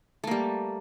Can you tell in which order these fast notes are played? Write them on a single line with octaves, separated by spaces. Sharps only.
A3 A#3 G3